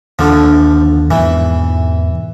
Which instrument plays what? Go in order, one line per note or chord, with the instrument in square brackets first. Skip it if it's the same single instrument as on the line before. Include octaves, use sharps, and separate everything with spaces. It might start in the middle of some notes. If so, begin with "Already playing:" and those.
[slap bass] D#2 [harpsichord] D3 F3
[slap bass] E2 G#2 B2 [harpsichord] E3